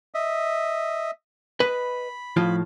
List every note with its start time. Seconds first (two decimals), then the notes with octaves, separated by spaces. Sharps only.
0.14 D#5 E5
1.60 B4 D#5 B5
2.37 A2 F3 F4